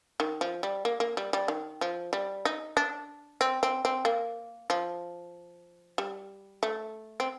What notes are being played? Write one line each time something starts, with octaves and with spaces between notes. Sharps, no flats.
D#3
F3
G3
A#3
A#3
G3
G3
D#3
F3
G3
D#4
D4
C4
C4
C4
A#3
F3
G3
A3
C4